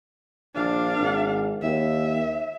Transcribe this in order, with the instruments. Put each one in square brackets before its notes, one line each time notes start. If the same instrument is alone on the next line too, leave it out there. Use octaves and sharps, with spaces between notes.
[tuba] A#1 [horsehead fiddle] D4 F5
[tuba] G#1
[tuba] D#2 [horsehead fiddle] E5